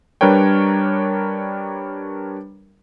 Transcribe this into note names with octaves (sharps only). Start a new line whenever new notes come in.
G3 D4 A#4 B4 C#5 G5